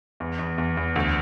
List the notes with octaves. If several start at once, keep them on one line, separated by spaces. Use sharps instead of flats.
E2
E2
E2
E2
D2